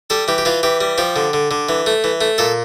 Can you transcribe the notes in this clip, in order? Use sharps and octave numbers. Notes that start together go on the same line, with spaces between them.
G3 A4
E3 G4
G4
E3 F4
E3 G4
G3
F3 G4
D3
D3
D3
E3
A3
E3
A3
A#2 A4